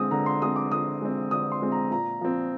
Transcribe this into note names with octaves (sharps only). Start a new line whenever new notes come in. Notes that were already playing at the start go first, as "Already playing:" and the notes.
Already playing: D3 G#3 C4 D#6
D3 A#5
C6
G#3 C4 D#6
D6
D3 D#6
G#3 C4
D3 D#6
C6
G#3 C4
A#5
A#2 A#5
F3 C4